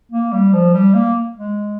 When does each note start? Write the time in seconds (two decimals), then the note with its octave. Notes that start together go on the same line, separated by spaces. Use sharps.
0.11 A#3
0.33 G3
0.53 F3
0.74 G3
0.94 A#3
1.37 G#3